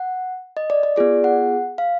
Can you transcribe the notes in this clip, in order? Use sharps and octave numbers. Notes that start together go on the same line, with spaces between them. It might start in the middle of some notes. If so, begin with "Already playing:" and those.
Already playing: F#5
D#5
D5
D5
B3 F4 G#4 D5
F#5
F5